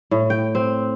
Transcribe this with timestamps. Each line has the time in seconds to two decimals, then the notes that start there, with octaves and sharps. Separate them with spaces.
0.11 A2
0.30 G5
0.55 C4